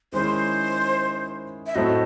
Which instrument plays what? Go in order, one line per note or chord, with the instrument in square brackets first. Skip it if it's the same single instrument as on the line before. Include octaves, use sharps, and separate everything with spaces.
[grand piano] D#3 G#3 C#4 E4 G#4 [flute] C5
[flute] E5
[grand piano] A2 F#3 A3 C4 [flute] D#5